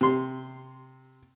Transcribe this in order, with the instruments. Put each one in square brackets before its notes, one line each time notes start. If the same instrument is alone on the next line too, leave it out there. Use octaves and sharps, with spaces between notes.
[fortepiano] C3 C6